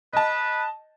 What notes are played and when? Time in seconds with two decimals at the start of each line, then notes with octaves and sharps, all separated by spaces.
0.13 B4 D#5 A5